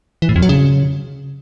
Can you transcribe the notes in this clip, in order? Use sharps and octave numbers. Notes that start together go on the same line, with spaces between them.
E3
A2
F2
F#3
C#3